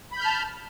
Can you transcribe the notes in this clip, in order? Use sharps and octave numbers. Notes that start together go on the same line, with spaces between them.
A5 B5 F6 G6